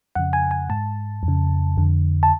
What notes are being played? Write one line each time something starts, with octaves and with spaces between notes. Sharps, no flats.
F2 C#3 F#5
G#5
G#5
G#2 A5
F2
C#3
F2 D3
A5